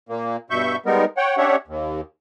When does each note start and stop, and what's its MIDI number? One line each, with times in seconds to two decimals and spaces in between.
0.09 0.37 46
0.09 0.37 58
0.50 0.76 43
0.50 0.76 47
0.50 0.76 76
0.50 0.76 85
0.50 0.76 91
0.86 1.05 55
0.86 1.05 56
0.86 1.05 59
0.86 1.05 63
0.86 1.05 70
1.17 1.36 73
1.17 1.36 78
1.17 1.36 79
1.37 1.56 61
1.37 1.56 62
1.37 1.56 67
1.37 1.56 73
1.37 1.56 76
1.37 1.56 78
1.68 2.01 39